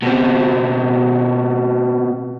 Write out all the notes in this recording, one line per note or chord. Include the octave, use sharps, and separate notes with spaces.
B2 C4